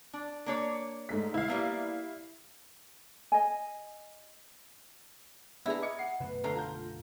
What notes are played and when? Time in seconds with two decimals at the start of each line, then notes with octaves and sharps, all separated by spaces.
0.13 D4
0.46 A#3 D4 C#5
1.09 G#2 A3 B6
1.34 E4 F5
1.48 G3 A#3 B3
3.32 D#5 G#5
5.66 B3 D4 E4 G#4 A#5
5.82 D#5 D6 G#6 C#7
5.99 F#5 C7
6.20 F#2 B2 A3 B4
6.44 D3 F5 A#5
6.56 F4 A#5 G6